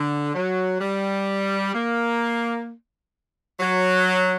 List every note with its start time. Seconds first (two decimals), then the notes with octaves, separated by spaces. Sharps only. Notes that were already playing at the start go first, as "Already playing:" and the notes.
Already playing: D3
0.34 F#3
0.81 G3
1.74 A#3
3.60 F#3